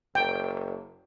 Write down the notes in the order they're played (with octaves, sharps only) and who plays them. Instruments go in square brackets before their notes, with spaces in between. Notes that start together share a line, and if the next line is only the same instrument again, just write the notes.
[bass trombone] F#1 [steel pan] G5